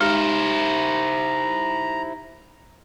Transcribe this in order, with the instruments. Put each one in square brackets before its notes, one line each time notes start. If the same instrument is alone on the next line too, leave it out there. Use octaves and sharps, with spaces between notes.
[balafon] G#3 [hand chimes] D#4 G4 [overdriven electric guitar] E4 C5 [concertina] A#5